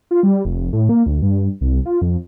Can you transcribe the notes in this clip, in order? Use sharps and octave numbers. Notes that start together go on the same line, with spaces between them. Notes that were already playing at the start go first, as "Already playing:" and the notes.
F4
G3
F1
A2
A#3
D2
G2
C2
F4
F2